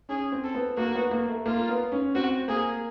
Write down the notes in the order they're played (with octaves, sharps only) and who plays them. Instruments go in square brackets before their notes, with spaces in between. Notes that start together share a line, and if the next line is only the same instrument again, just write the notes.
[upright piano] C#4 [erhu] G#4
[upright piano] C4
[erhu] A4
[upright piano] B3
[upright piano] A#3 [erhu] F#4
[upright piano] B3
A#3
A3
[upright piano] A#3 [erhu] F4
[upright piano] B3
C#4
[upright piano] C4 [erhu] F#4
[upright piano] A#3 [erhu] G#4